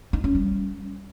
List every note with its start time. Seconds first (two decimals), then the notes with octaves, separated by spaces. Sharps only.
0.13 D#4
0.24 C#4
0.35 G3